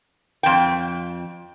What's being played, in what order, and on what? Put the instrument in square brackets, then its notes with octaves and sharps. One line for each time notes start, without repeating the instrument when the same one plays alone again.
[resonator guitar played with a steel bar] F2 G5